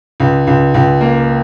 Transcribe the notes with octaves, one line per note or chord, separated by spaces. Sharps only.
C#2
C#2
C#2
A#3